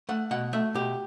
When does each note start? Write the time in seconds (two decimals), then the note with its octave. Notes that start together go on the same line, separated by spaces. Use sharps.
0.09 A3 F#5
0.31 B2 F#5
0.53 A3 E5
0.75 B2 G4